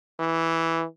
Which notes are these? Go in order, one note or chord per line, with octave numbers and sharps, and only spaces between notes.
E3